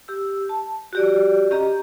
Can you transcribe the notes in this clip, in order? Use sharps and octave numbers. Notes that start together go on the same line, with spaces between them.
G4 E6
A5
F#4 G4 D5
C#4 G4 D#5 A#5